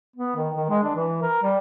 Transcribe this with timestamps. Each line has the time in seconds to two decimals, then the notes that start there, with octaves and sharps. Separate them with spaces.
0.16 B3
0.36 D#3
0.56 D#3
0.70 G#3
0.83 D4
0.95 E3
1.22 A#4
1.43 G3